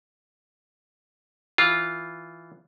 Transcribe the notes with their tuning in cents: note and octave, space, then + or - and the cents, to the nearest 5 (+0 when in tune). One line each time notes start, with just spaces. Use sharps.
E3 +0 F4 +0